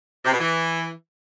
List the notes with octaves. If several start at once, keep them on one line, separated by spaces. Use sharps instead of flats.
C3
B2
E3